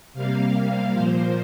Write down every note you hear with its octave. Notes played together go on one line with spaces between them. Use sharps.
C3 G3 A#3 F5
A#2 F3 A#3 C5